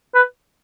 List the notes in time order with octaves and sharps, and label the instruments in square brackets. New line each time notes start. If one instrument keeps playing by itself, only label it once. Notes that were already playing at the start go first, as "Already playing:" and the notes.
[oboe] B4